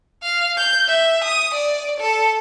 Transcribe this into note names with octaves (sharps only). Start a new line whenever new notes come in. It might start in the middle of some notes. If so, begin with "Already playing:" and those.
F5
G6
E5
D#6
D5
A4